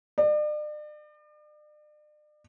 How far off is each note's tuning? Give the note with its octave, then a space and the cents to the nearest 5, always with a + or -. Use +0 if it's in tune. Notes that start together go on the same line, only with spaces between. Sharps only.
D5 +40